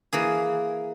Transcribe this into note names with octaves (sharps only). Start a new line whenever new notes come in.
E3 A#3 G#4